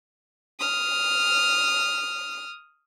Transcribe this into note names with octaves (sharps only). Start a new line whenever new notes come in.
D#6 F6